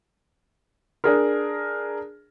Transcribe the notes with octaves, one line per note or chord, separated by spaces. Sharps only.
D4 G#4 A#4